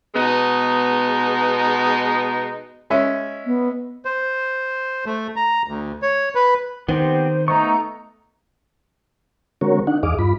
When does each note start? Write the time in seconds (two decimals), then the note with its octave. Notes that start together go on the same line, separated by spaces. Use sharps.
0.15 B2 G#3 B3 D#4
2.90 G#3 C#4 E5
3.46 B3
4.05 C5
5.06 A3
5.36 A#5
5.68 D2
6.02 C#5
6.35 B4
6.89 D#3 B3 C4 G4 C5
7.48 A3 B3 D#4 A#5 C#6
9.61 D3 G#3 C4 F#4 A#4 C#5
9.87 D4 D#4 F#5
10.03 E2 G#4 D#5 F5 D6
10.19 G2 F4 B5